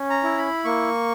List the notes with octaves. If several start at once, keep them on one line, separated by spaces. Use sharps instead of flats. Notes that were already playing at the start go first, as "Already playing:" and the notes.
Already playing: C#4
A#5
E4
B5
A#3 C#6